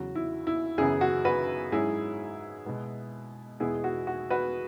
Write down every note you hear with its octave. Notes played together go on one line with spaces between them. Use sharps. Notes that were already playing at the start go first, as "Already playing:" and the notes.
Already playing: E2 C#3 F#3 F#4
E4
E4
F#2 C#3 E3 B3 E4 G#4
F#4
F#4 B4
G#2 F#3 C#4 E4 G#4
B2 G#3 B3
E2 B2 G#3 B3 E4 G#4
F#4
F#4
F#4 B4